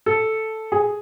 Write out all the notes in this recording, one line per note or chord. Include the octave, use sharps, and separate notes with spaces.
A4
G#4